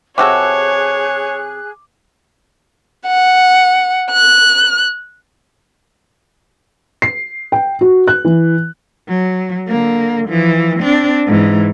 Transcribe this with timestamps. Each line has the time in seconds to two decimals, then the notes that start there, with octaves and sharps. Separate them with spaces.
0.18 C3 F#4 G#4 A4 C#5 D6 F#6
3.07 F#5
4.11 F#6
7.02 C7
7.52 G5
7.81 F#4
8.08 F#6
8.25 E3
9.09 F#3
9.68 D3 A#3
10.28 E3 F3
10.80 C4 D4
11.27 G#2 E3